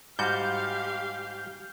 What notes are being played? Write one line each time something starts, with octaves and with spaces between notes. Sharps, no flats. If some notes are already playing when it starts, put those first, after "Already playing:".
G#2 G3 F#4 G4 F5 G6